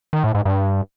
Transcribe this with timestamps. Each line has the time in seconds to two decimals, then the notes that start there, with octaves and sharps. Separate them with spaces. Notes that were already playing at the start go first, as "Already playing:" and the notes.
0.13 D#3
0.24 A2
0.35 G#2
0.45 G2